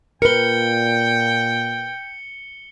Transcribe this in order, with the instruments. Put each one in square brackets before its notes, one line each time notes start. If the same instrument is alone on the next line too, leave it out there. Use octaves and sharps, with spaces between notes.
[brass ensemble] A#2 [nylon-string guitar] A#4 B4 [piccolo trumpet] G5 [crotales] C#7 G7